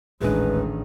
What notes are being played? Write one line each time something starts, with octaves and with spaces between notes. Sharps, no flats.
D#1 A1 D#3 G#3 D4 G#4 B4